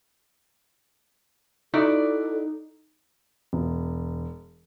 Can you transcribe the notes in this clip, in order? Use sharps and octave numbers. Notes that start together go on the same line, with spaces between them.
D#4 E4 F#4 A4 D5
E1